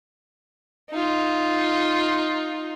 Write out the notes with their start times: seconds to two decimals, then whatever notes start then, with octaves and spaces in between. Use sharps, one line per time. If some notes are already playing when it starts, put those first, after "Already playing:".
0.90 D#4 F4